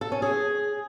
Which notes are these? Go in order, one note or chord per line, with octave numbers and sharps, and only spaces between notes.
A4
C#4
G#4